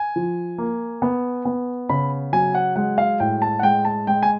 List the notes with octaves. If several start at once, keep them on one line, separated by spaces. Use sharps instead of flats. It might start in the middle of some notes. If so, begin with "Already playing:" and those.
Already playing: G#5
F3
A#3
B3
B3
C#3 B5
F#3 G#5
F#5
G#3 F#5
F5
A2 G5
A5
F#5
G#3 G5
A5
G#3 G5
G#5